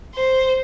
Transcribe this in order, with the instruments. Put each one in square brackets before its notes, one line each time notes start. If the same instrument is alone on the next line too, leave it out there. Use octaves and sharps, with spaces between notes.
[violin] C5